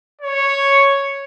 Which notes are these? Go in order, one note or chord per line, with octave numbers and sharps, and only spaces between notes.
C#5